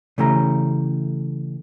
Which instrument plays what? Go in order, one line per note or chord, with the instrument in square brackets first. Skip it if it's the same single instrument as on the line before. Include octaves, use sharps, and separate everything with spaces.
[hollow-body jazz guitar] C#3 E3 A3 C#4 G4 A#5